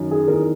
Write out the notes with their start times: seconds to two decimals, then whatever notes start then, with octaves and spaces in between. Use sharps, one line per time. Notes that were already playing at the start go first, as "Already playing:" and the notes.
Already playing: F#2 D#3
0.11 G#4
0.28 E2 D#3 A#4